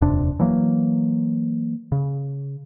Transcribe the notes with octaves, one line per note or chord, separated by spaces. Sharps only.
D#1 F2 C3 D4
E3 F#3 A#3
C#3